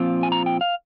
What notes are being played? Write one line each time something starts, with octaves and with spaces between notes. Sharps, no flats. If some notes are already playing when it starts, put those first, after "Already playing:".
Already playing: A#2 F3 C4 F4
G#5
A#5
G5
F5